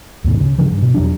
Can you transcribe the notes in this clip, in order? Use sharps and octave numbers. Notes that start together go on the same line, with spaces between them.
D2 G#2 B2 D#3
C#3
G2 C#3 E3 F3
G2
B2
E2 F#3 D4